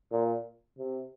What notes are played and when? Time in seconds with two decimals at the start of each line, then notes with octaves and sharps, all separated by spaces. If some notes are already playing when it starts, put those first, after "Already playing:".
0.12 A#2
0.78 C3